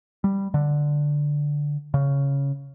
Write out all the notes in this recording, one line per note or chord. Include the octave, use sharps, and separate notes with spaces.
G3
D3
C#3